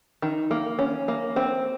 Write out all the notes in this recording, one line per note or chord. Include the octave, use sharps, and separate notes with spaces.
D#3
A#3
C#4
A#3
C4